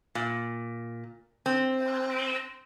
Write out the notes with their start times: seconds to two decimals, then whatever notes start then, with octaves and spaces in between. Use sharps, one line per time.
0.15 A#2
1.46 C4